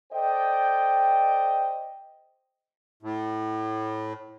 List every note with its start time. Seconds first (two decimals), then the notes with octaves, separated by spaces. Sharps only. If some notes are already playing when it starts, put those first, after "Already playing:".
0.13 A4 C5 D5 D#5 G5
3.03 A2